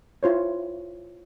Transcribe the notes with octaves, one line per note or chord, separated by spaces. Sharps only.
E4 F4 C5 C#5